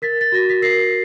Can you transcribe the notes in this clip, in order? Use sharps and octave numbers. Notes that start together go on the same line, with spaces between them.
A#4 A6 B6
A6
F#4 A#6
B6
A#4 A#6 C7